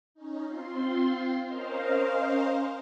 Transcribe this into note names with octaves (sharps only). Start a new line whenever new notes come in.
C#4 D#4
C4 F4 C6
C#4 A#4 C5 D#5 F5